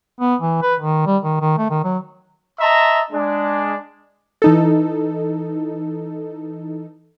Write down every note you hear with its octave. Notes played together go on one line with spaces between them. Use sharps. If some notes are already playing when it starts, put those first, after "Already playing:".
B3
E3
B4
D#3
G3
D#3
D#3
A3
D#3
F#3
D#5 E5 A5 A#5 C6
G#3 D4
E3 D#4 A4